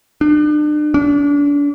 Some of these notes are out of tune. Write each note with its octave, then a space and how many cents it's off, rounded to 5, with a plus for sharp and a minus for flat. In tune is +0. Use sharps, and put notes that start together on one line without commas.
D4 +40
D4 -35